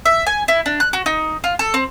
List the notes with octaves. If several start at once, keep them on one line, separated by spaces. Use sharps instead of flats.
E5
G#5
E4
D4
F#6
F#4
D#4
F4
A4
C4